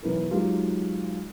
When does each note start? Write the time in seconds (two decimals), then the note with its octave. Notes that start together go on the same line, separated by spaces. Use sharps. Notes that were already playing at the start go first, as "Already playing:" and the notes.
0.03 E1 B1 E3 A#4 B4
0.30 F#3 G#3 D#4 F4 G4 A#4